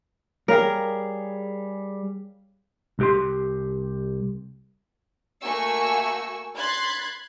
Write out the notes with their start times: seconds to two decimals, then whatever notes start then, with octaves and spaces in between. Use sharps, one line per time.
0.48 G3 G#4 A#4 C#5 F5 G5
2.99 C2 G4 C6
5.42 A3 A#3 F#4 G#5 C#6 E6
6.58 B5 C6 F#6 G#6 A6